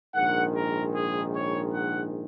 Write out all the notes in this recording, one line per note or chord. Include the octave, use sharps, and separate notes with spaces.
A#1 G#2 D#3 F#5
A#4
G#4
C#5
F#5